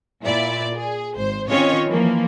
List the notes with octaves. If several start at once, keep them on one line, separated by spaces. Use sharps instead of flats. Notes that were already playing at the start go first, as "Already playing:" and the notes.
A#2 E4 D5
G#4
G#1 C5
D#3 C4 C#4 F4 C#5 D#5
E3 F3 A#3